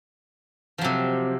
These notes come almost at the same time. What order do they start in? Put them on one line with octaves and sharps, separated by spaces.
F3 F#3 C3